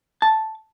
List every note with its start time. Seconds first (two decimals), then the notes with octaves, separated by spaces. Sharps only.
0.22 A5